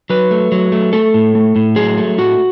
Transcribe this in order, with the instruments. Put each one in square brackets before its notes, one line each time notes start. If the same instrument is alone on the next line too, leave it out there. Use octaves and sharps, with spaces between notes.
[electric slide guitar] F#3 B4
A3
F#3
A3
A3 A4
A2
A3
A2
F#3 G#4
A3
A2 F#4